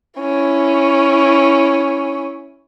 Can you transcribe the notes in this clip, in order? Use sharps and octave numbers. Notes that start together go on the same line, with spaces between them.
C#4 E4